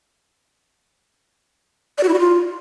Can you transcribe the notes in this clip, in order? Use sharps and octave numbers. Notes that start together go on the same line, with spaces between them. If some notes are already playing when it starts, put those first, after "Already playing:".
D5
F#4
E4
F#4
F4